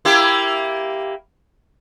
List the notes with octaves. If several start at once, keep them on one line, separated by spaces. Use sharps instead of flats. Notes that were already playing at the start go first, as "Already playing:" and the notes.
A#3 E4 G4